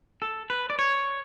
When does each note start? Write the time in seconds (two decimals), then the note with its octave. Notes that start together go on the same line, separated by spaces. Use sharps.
0.22 A4
0.50 B4
0.70 D5
0.79 C#5